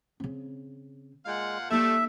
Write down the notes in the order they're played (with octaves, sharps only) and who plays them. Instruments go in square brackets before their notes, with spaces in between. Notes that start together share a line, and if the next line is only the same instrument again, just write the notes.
[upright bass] C#3 C4
[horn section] A#2 F5 F#5 [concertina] G#3
[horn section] G3 A3 [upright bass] A#3 D#4 [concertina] E5